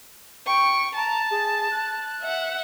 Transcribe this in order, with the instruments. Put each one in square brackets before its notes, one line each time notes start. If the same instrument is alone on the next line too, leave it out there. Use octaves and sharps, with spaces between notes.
[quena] G5 [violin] C#6
[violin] A5 [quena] A#5
[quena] G#4
F#6
[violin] E5 F#5